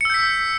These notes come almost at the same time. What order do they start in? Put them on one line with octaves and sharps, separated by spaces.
C#7 E6 G6 B6